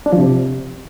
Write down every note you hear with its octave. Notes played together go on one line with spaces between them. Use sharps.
D4
F3
C3